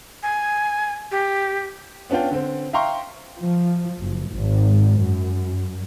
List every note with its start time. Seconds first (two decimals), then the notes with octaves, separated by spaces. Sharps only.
0.23 G#5
1.11 G4
2.10 B3 C#4 D4 F4 G5
2.31 D3 C4
2.73 E5 F5 G5 A#5 C6 C#6
3.39 F3
4.00 F#1
4.31 G#1
5.02 F#2